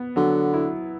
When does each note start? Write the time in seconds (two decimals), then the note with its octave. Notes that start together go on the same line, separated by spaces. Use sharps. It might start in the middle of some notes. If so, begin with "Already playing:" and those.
Already playing: B3
0.16 D3 F#3
0.54 E4